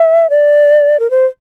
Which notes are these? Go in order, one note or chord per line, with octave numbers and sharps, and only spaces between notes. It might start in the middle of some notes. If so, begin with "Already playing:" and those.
Already playing: E5
D5
A#4
C5